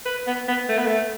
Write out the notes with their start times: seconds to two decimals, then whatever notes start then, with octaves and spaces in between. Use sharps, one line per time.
0.06 B4
0.27 B3
0.48 B3
0.69 A3
0.78 B3
0.87 A3